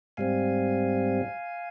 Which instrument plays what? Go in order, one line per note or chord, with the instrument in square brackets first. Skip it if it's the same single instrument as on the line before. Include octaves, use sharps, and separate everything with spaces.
[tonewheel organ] G#2 G3 C4 F5 G#5